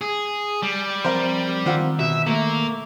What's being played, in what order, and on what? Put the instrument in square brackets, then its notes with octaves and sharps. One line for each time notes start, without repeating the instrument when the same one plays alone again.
[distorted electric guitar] G#4
G3
[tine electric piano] F3 C4 [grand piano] A#4 C5
[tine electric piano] D#3 A#5 E6 [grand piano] C4 F4 F#5
[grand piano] B2 [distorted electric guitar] E5
[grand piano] A3 [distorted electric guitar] A#3